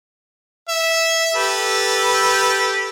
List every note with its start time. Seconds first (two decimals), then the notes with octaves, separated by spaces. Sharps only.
0.69 E5
1.35 G4 A4 B4